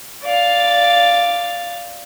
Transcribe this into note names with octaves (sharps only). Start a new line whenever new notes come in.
D5 F5